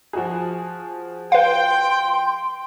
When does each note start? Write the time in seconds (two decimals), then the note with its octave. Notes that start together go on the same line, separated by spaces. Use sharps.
0.13 F3 F#4 G#4
1.32 B4 F5 G5 C6